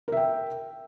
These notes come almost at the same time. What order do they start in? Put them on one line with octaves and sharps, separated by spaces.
A#4 E5 G5